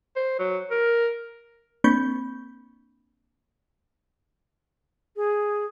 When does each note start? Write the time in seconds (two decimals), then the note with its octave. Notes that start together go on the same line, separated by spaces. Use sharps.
0.16 C5
0.39 F#3
0.71 A#4
1.84 A#3 C4 D4 B5 C#6 G6
5.16 G#4